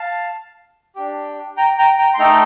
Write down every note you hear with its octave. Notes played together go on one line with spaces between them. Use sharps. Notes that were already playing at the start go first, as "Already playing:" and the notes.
Already playing: F5 A5
D4 G4
G5 A#5
G5 A#5
G5 A#5
C6
A3 D#4 A4 G5 A#5